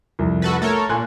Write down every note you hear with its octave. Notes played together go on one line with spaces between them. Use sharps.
C2 F2
F#4 A4 B4
A3 A4 A#4 C#5
A#2 G#5 C6 F#6